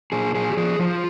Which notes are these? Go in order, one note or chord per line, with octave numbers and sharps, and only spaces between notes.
A#2 G#4
A#2 G#4
G4
F3 G#4
F3 F4